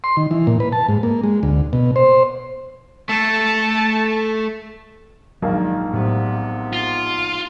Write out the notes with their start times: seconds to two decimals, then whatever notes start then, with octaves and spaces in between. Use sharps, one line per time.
0.04 C6
0.17 D#3
0.31 E3
0.47 A#2
0.60 B4
0.72 A5
0.89 G#2
1.03 A#3
1.24 G#3
1.43 D2
1.73 B2
1.96 C5
3.09 A3 A4 A5
5.42 A#1 G#2 D#3 F#3 A#3 D4
5.93 A2 C3 F#3 B3
6.73 F4